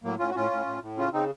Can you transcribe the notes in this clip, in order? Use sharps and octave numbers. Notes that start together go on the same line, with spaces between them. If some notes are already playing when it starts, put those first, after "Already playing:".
A2 F#3 A#3
A2 C#4 F4
F#4
A2 C#4 F4
A2
A2
A2
C#3 C#4 F4
C#3 C4 D#4